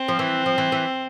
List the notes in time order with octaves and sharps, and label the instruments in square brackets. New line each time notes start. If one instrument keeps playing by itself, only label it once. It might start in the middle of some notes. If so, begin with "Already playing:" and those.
Already playing: [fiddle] C4
[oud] F3
E3
F3
E3
E3